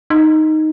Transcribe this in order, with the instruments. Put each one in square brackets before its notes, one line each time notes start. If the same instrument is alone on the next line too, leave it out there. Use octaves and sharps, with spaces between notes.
[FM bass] D#4